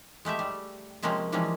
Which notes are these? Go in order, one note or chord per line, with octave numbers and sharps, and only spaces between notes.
G#3 A3 G4 E5
G3
C3 F3 G#3 A#3 C4 C#4
E3 F3 G3 G#3 A#3 C#4